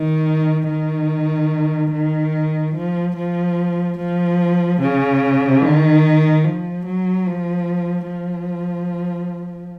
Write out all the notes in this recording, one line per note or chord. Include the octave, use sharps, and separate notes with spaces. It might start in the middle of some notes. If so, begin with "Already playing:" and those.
Already playing: D#3
D#3
D#3
F3
F3
F3
C#3
D#3
F3
F#3
F3
F3